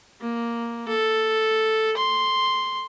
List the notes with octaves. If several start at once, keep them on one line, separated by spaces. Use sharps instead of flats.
A#3
A4
C6